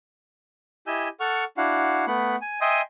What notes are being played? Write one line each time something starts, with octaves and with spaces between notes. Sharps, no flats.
E4 G4 D#5 G#5 E6 G6
A4 F#5 C#6 F6
D4 E4 F#4 F5 F#5
A3 B3 F#5 B5
G#5
D#5 E5 G5 G#5 C6 D#6